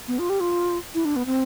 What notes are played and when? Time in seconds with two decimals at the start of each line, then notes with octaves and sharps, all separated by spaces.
0.08 B3
0.19 F4
0.30 G4
0.40 F4
0.95 E4
1.05 D4
1.16 B3
1.26 C4